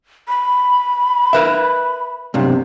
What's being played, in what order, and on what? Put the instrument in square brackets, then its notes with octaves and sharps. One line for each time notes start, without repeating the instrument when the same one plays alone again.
[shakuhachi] B5
[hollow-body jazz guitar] A#4 B4 E5
B1 G2 C3